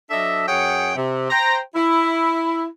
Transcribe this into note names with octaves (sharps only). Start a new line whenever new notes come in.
F#3 D4 A4 D#5 E5
F#2 G#4 C#5 F#5 G5
C3
C5 G5 A#5
E4